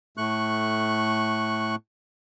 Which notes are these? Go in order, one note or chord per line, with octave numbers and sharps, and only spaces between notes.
A2 A3 C#6 F#6